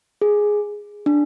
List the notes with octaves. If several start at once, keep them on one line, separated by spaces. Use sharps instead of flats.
G#4
D4